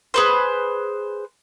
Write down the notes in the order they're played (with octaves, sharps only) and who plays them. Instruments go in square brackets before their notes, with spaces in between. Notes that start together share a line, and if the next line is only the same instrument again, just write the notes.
[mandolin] G#4 B4 C5